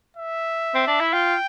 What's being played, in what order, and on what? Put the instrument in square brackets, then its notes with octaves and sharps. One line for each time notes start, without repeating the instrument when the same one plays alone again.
[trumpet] E5
[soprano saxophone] C4
D4
E4
[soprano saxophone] F4 [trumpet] G5